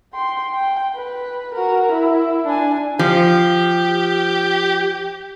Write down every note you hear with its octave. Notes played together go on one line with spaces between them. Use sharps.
G5 C6
G5
B4
F#4 A#4
E4
D4 G#5
F3 G4